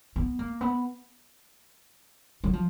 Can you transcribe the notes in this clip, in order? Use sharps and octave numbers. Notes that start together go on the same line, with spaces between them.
B3
A#3
B3
F#3
F3